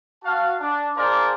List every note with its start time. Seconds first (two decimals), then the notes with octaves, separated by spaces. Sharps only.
0.24 F#4 F5 A5
0.60 D4
0.97 D4 F4 G#4 A#4 C5 D5